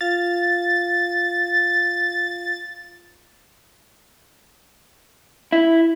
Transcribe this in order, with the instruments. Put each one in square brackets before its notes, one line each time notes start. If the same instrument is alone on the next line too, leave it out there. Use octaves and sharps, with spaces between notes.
[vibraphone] F4 F5 [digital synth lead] A6
[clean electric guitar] E4